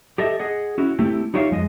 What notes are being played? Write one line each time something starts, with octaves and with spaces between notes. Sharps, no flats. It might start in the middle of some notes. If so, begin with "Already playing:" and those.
G4 A4 D#5 E5
G#4 D#5 F#5
C#4 E4 F#4
A3 C4 E4 G4
D#4 F4 G4 C#5 E5 F5
F2 G#3 D#5